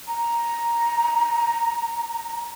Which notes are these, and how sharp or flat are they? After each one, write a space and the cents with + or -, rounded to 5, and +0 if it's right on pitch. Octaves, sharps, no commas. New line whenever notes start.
A#5 +5